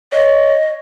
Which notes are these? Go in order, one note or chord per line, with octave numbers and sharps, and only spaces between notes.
C#5 D#5